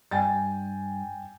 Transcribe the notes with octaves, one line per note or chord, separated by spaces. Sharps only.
G2 G5 G#5 A6